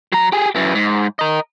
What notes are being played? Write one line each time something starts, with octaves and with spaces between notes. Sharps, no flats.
F#3 A#5
G4 G#4
F#2 E3
G#2
A#4 D#5